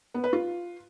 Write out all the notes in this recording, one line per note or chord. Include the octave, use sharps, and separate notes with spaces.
B3
B4
F4